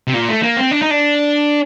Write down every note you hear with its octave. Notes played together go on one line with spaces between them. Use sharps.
C3
A#2
A3
A#3
C4
D4
D#4
D4